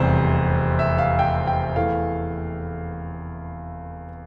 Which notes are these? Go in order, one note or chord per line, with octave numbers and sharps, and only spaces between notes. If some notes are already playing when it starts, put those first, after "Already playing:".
Already playing: F1 E2 C3 G3 C5
E5
F5
G5
G5
E2 E3 A3 F5